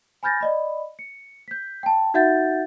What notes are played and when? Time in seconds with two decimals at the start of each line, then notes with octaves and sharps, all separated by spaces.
0.23 G#5 B5 F6 G6 A6 A#6
0.41 D5 D#5 B5
0.99 C#7
1.48 G6 B6
1.83 G5 A5
2.14 D#4 F#4 E5 F#5 G6 A6